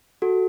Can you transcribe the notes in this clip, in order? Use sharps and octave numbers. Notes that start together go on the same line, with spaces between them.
F#4 A4